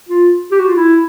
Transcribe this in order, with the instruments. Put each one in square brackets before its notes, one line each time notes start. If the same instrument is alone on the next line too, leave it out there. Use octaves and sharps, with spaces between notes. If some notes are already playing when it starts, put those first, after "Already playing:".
[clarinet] F4
G4
F#4
F4
E4